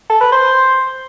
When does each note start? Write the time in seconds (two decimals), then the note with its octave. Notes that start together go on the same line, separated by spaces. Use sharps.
0.10 A4
0.21 B4
0.32 C5